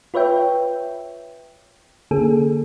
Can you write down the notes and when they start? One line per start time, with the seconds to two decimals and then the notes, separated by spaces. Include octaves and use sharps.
0.14 F4 B4 C#5 E5 G5
2.11 D3 A#3 C#4 G#4 A4